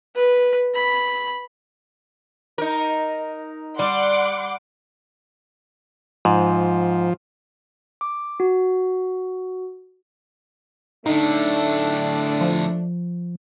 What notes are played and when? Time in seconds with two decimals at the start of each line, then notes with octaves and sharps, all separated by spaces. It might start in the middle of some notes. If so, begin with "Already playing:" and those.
0.15 B4
0.75 B5
2.58 D#4 A#4
3.79 G3 D5 F#5 C6 D6
6.25 G#2 F3
8.01 D6
8.40 F#4
11.06 A2 D3 A3 D4 D#4
12.41 F3